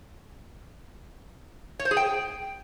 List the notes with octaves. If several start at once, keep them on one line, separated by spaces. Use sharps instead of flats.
C#5
C5
G#4
G5